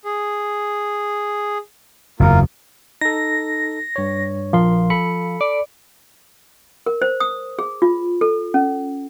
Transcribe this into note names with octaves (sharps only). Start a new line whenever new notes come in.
G#4
F#1 E2 A#3 F4
D#4 A4 A#6
G2 C#5
A#1 F3 A#4 C6
A4 B5 C#7
D5
A#4
C5
D#6
G#4
F4
A4
C#4